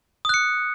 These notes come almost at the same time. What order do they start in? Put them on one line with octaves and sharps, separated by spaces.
D#6 F#6 C#7